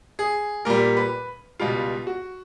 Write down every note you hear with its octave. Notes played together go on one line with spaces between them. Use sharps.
G#4
A#2 G3 A#4
B4
C#2 B2 G3 F4
F#4